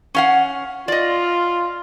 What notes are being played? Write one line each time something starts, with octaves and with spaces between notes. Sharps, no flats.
C#4 F5 F#5
F4 D5 D#5